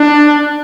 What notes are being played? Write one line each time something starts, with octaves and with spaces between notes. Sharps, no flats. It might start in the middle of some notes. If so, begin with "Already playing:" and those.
Already playing: D4